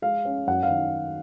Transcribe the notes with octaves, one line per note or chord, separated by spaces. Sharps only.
G#3 F5
C#4
F#2 F#5
F5
D#3